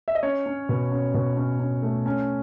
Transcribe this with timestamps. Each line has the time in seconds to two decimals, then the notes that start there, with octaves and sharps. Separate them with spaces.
0.08 E5
0.15 D#5
0.23 C#4 C#5
0.46 C#4
0.69 B2
0.91 C#4
1.14 B2
1.37 C#4
1.60 C#4
1.82 A3
2.06 C#4